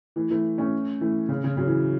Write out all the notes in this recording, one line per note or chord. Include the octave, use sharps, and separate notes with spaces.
E3 A3
E3 A3
A3 C#4
E3 A3
C#3
C#3
C#3 F#3
E3